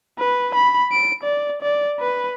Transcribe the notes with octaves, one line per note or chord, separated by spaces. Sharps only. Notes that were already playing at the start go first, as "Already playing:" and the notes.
B4
B5
D7
D5
D5
B4